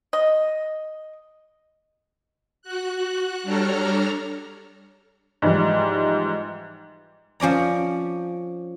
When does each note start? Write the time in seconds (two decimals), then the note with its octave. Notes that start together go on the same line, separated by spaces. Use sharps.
0.13 D#5
2.62 F#4 F#6
3.43 G3 D4 A4 C#5 A#5 F6
5.42 G#2 E3 F3 G3
7.40 F3 C#4 D5 A#5